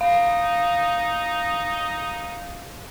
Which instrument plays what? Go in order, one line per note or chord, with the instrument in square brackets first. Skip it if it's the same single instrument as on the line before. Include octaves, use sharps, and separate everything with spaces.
[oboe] D#4 [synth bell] F5